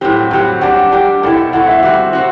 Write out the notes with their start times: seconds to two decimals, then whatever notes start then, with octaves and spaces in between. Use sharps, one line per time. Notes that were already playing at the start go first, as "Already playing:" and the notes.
0.01 A2 F#3 C4 G4
0.31 A2 F#3 C4 G4 G5
0.61 G3 D4 G4 F#5
0.92 G3 D4 G4
1.23 B2 A3 C4 E4 G5
1.53 B2 A3 C4 E4 F#5
1.68 E5
1.83 G3 C4 F#4
2.13 C4 F#4